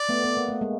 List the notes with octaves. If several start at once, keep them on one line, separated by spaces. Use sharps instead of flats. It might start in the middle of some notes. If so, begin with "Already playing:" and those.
Already playing: D5
A3 B3
B3
A#3
A3
G#3 A#3